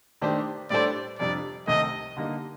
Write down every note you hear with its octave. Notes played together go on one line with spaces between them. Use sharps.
D#3 A3 D4 G4 C5
A2 G3 D4 A4 C5 D5
F2 C3 G3 D4 D5
C2 C3 D#3 A3 D#4 D#5
D3 G3 A#3 D#4